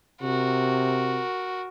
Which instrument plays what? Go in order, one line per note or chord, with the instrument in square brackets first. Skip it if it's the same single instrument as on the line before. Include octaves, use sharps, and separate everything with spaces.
[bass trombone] C3 [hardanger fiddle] F#4 A#4